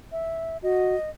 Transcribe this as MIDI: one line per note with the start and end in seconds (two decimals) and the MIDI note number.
0.12 0.57 76
0.63 0.96 66
0.63 1.10 75